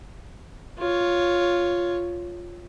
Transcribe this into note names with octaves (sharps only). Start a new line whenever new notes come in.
F4 C#5